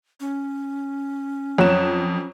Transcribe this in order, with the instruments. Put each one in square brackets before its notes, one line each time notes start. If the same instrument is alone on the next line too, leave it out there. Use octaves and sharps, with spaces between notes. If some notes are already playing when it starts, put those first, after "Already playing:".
[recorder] C#4
[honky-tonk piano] F2 E7 [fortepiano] F#3